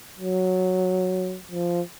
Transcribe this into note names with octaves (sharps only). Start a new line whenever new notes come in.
F#3
F3